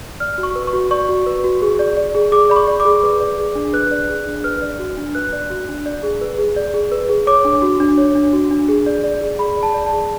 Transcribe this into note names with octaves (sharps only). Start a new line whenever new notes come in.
D5 F6
F#4
C#6
B4
C#6
F#4
D5 C#6
F#4
B4
F#4
G#4
D5
D5
G#4
G#4 D6
D5 B5
C#6
D5
D6
G#4
B4
D5
G#4
D4
B4 F#6
D5
G#4
D4
B4 F6
D5
F#4
D4
B4 F#6
D5
F#4
D4
D5
G#4
B4
G#4
D5
G#4
B4
G#4
C#5 D6
D4
F#4
D4
C#5
D4
F#4
D4
G#4
D5
D5
G#4
G#4 B5
D5
A5
D5
A5
G#4